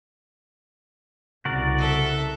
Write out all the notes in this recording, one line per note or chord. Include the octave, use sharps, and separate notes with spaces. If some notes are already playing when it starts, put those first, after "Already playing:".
C2 C#3 F#4 A#4 D5
A4 E5